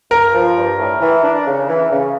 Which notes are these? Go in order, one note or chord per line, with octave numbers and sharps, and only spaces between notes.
G2 A#4
F3
G2
A2
E3
D4
C#3
E3
C#3